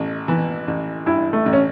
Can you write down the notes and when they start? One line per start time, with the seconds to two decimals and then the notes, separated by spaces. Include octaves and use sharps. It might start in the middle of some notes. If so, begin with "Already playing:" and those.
Already playing: A1
0.28 E3
0.68 A1
1.06 G2 E4
1.33 A3
1.46 A1
1.53 C#4